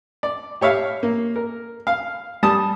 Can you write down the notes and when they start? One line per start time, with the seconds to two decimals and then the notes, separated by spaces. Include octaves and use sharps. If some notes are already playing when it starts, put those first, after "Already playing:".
0.23 D5
0.61 G4 C#5 E5 F5
1.03 A#3
1.36 A#4
1.87 F5
2.43 G3 A5 D#6